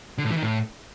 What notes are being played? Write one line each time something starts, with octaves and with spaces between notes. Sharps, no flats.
D3
A2
E3
D#3
A2